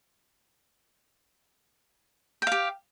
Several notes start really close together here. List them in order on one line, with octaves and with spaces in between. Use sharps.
G5 F5 G4